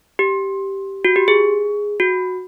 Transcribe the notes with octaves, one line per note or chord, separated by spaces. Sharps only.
G4
F#4
G4
G#4
F#4